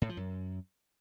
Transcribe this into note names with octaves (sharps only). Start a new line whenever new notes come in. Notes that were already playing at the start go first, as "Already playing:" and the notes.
A2
F3
F#2